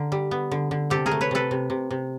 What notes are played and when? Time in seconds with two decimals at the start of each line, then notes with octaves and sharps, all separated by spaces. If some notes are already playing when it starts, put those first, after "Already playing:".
Already playing: D3 A#4
0.12 G3
0.31 B3
0.51 D3
0.71 D3
0.90 C3 G4 A4
1.06 G#4 A#4
1.11 A3
1.21 B4 C#5
1.31 C3 A4 B4
1.51 C3
1.70 C3
1.91 C3